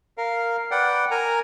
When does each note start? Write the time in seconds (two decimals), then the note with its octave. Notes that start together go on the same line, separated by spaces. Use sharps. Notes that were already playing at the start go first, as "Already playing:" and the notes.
0.18 A#4 F5
0.71 B4 D5 F#5 G5
1.11 A#4 G#5 A#5